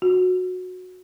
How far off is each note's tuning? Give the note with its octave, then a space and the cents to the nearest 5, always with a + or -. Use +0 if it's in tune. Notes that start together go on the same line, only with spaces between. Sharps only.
F#4 -15